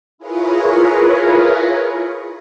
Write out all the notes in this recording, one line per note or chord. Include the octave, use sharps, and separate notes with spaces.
E4 F4 G#4 A#4 B4 C#5